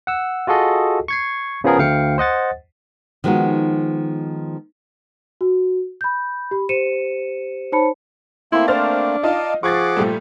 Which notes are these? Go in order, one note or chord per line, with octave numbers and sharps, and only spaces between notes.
F#5 E6
F4 F#4 G#4 A4 D#5
C#6 G#6 C7
C#3 F3 B3 G#4 A#4
D2 F5 G5 C#7
C5 D#5 F#5 A6
D#3 F3 G#3 B3 D#4 F#4
F#4
B5 G6
G4 B5
G4 C5 C#7 D#7 E7
D#4 C5 C#5 A5 B5 C#7
A3 A#3 C4 E4 C6
D4 C5 F6 A6
D#4 F4 D5 F5 A5
F3 G#4 F#5 C#6 D6 G#6 A6
A#2 G3 A3